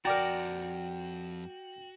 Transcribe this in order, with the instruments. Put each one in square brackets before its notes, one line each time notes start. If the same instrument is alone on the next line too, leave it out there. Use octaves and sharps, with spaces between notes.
[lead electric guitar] F2 A#5 [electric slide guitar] F#4 [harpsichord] A#4 D5 A5 [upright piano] G5